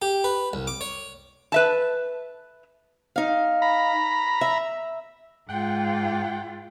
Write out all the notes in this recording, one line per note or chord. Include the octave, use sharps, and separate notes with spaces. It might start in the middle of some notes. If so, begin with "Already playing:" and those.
G4
B4
C2
D6
C#5
B4 E5 A5
D#4 F5
A#5 B5
E5
G#2 F4 F#5 G5